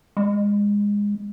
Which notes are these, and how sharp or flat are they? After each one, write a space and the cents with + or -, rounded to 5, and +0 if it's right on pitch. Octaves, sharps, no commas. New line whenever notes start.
G#3 -20